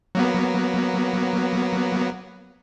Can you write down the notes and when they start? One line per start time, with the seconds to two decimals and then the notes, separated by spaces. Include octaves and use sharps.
0.15 F#3 A#3 B3